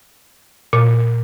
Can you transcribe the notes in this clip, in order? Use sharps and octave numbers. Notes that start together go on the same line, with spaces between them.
A#2